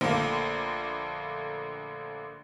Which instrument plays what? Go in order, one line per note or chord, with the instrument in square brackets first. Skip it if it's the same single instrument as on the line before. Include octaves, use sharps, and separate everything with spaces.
[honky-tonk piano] A#1 D3 A3 A#3